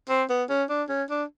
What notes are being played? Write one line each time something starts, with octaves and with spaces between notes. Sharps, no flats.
C4
B3
C#4
D4
C#4
D4